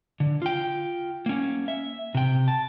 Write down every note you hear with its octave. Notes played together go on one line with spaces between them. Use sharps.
D3
F4 G5
A#3 C#4
E5
C3 G5
A5